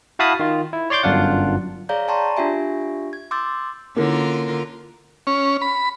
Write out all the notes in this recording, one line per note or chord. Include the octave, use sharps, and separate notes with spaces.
E4 F#4 F5 A5 B5 D#6
D#3 F4
E4
C#5 D5 C6 D6 G6
G1 F#2 D4 F4 F#5
G#4 C#5 D5 F5 A#5 G6
D5 G5 A5 A#5 C6 C#6
D4 F4 G4 E5 G#5
G#6
C6 D6 E6 G6 A6
D3 A#3 C#4 E4 F4 A#4
C#4
B5